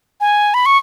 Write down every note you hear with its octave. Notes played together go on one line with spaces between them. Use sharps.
G#5
B5
C#6